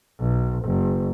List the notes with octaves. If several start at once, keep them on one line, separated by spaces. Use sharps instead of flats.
B1
F#1